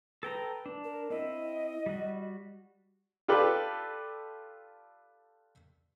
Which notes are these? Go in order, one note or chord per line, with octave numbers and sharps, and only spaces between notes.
A4 B4 G5 A#5
D4
A#4
C4 E4 D#5
G3 F#4
F4 G4 A4 B4 D5